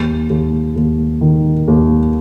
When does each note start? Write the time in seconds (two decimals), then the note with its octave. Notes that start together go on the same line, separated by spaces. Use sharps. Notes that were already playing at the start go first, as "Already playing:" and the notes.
Already playing: D#2
0.30 D#2
0.76 D#2
1.21 D#3
1.68 D#2